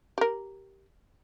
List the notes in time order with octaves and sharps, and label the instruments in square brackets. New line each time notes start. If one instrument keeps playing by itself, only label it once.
[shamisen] G4 A#4